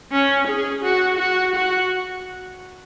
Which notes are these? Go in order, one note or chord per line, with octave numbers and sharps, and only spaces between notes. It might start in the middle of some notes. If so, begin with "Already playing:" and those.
C#4
G#4
F#4
F#4
F#4